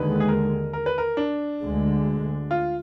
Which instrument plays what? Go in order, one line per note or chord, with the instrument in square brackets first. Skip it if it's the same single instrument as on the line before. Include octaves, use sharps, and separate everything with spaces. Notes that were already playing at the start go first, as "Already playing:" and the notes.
Already playing: [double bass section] D#2 D3 G#3 [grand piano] B4
[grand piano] G#4
A#4
A#4
B4
A#4
D4
[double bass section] D2 D3 G#3
[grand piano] F4